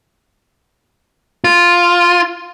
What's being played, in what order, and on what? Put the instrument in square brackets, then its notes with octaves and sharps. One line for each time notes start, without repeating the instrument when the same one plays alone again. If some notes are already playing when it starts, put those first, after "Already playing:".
[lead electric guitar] F4